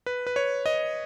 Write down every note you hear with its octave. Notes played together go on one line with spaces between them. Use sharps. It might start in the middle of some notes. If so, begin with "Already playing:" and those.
B4
B4
C#5
D#5